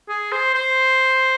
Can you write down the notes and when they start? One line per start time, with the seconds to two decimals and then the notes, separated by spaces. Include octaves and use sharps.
0.08 G#4
0.32 C5
0.54 C5